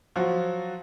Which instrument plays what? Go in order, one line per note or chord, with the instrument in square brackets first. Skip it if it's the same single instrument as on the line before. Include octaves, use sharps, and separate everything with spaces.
[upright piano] F3 F#3 F#4